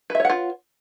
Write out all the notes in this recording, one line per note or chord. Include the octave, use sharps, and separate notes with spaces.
F4 B4 C#5 E5 F#5